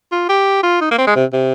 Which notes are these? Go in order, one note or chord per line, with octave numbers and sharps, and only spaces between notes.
F4
G4
F4
D#4
A#3
C4
G#3
C3
C3